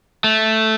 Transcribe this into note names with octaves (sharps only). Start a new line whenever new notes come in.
A3